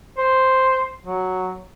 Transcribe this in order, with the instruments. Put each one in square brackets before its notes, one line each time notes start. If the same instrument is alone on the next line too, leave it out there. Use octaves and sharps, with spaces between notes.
[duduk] C5
F#3